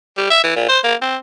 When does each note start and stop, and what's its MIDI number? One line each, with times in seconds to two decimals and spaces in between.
0.18 0.26 55
0.31 0.41 76
0.44 0.56 52
0.56 0.65 46
0.69 0.79 72
0.84 0.95 58
1.02 1.17 60